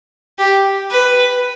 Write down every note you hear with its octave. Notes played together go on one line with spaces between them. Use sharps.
G4
B4